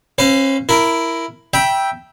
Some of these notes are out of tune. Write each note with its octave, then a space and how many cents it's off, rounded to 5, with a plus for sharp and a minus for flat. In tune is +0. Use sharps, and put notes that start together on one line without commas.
C#4 -40 B4 +40 F5 +0
E4 +5 A#4 +0
E5 +0 G5 +0 B5 -40